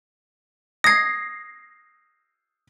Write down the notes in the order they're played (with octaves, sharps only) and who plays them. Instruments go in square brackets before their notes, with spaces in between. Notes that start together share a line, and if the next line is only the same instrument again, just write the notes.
[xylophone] D#6 G#6 [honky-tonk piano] A#6 C7